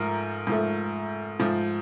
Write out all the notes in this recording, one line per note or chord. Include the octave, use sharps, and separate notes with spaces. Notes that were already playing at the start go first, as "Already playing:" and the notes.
Already playing: G#2 F3 A3 A#4
G#2 F3 A3
G#2 F3 A3